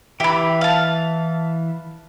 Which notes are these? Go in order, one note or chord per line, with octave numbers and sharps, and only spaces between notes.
E3 G4 E5 B5
F5 A5